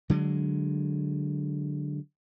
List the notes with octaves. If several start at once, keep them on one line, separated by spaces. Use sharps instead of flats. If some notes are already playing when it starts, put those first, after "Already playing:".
D3 F#3 G#3